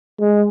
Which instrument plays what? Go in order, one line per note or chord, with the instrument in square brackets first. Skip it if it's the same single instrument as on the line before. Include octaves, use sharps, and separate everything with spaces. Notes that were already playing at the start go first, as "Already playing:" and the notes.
[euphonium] G#3